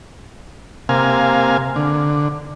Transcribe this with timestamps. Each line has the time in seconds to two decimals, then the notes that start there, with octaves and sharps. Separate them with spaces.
0.89 C3 A#3 F5 G#5
1.76 D3